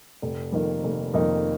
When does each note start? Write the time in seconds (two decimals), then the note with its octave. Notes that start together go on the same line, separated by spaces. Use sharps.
0.22 F1
0.52 F2 D#3 A#3 D#4
0.84 F1
1.14 F2 D#3 A#3 D#4